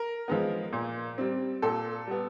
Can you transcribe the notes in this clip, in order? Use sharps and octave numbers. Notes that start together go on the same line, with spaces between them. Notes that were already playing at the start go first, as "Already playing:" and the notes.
Already playing: A#4
F3 G#3 B3
A#2
G3 C4
A#2 A4
G3 B3